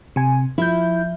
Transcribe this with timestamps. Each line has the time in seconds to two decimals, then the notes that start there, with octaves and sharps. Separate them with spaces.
0.16 C3 G#5
0.58 F3 E4 G6